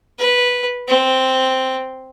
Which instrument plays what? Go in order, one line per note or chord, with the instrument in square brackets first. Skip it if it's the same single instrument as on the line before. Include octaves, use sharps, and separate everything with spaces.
[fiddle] B4
C4